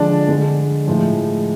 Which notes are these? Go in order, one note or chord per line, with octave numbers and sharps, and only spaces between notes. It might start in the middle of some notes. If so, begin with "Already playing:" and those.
Already playing: D3 F3 G#3 D4
D3 G#3
A2 F3 G#3